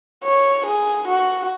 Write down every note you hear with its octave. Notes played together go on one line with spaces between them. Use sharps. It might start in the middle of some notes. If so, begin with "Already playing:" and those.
C#5
G#4
F#4